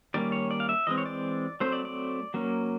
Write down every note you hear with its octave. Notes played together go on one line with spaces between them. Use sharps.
D#3 G3 A#3 C#4 D5
C#5
D5
F5
E5
E3 G#3 C4 D#5
C#5
D5
F#3 A3 C4 C5
D5
D5
F#3 A#3 C#4